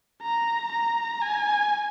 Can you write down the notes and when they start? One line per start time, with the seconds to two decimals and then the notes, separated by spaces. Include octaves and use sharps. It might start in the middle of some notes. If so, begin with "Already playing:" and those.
0.22 A#5
0.72 A#5
1.22 G#5